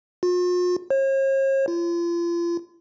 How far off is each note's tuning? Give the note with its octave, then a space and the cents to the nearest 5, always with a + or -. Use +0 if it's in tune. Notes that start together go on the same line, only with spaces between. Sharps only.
F4 +45
C#5 -45
F4 -35